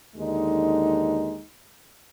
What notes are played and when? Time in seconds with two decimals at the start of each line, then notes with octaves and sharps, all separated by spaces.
0.15 D#2 D3 G#3 D#4